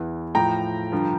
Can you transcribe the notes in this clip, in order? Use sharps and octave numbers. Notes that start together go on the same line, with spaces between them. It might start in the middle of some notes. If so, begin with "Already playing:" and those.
Already playing: E2 E3
A2 F3 G5 A#5
G2 D3 F3